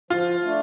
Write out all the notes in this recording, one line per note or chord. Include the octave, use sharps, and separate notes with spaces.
F3 F4
A3 D4